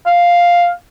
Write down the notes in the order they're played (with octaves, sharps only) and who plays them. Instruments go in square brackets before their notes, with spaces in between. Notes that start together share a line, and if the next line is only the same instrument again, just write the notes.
[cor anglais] F5